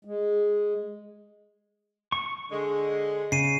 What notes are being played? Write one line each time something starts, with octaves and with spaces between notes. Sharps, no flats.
G#3
C#6
D3 G#3
C#3 C7 D#7